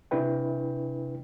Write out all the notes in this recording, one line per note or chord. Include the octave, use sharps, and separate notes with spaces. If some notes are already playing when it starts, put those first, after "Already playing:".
C3 D4 E4 B4 G5